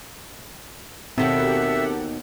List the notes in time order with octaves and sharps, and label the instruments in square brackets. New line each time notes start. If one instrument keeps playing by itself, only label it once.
[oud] D#2 B2 D#3 [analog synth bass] C4 [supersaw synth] G4 A4 F#5 [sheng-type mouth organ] E5